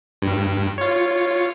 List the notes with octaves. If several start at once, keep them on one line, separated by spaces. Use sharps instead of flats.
G2
F4 C#5